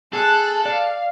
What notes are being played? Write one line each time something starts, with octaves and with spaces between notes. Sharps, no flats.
G#4 A4 A5 F#6
D5 F5